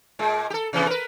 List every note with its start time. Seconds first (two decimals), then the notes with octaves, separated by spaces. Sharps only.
0.19 A#2 G#3
0.50 G4 A4
0.73 C3 E3 B3
0.87 A#4 B4